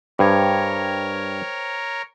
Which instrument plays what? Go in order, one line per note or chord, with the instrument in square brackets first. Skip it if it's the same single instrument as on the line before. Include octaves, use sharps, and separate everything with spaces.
[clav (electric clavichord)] G2 [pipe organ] A#4 C#5 [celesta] C5 G5 G#6